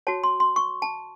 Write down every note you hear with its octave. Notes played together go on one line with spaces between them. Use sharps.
F#4 C#5 A5
C6
C6
C#6
A5